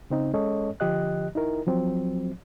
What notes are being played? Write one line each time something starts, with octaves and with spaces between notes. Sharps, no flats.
C#3 C4 D#4
G#3 C#4 A4 C#5 D#5
D3 F3 G4 D#5 F#6
D#4 E4 A#4
F3 F#3 C4